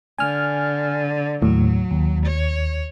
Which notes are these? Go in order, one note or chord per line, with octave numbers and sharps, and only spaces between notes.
D3 G#5 F6
D#2 A2 F#3
D#2
C#5